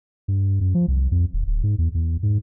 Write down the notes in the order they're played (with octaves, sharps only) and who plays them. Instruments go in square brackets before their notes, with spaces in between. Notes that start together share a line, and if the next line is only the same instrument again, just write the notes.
[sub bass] G2
F#2
F3
C2
F2
D#1
D1
G#2
E2
E2
G#2